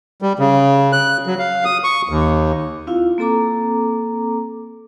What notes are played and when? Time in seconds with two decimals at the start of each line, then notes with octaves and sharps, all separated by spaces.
0.22 G3
0.39 C#3
0.93 F#6
1.27 F#3
1.39 F5
1.65 D#6
1.84 C#6
2.09 D#2
2.87 C4 E4 F4 F5
3.18 A#3 C4 A4 A#5 D6